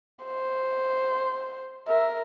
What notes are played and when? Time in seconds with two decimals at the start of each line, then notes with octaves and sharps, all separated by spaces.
0.25 C5
1.88 A#4 E5